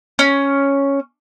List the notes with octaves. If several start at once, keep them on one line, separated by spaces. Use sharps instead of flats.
C#4